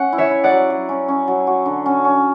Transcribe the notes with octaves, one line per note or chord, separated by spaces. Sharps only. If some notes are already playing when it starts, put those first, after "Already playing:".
Already playing: C#4 F#5
E4
C#5 E5
E4
D5 F#5
F#3
F#3
C#4
C#4
F#3
F#4
D3
C#4
C#4